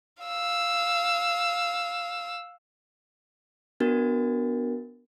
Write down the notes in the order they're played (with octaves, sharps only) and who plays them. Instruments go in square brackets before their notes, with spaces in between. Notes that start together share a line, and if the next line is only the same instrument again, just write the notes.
[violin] F5 E6
[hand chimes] B3 D4 F#4 A#4 A6